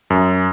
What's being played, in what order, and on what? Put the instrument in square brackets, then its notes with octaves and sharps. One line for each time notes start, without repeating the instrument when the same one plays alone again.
[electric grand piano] F#2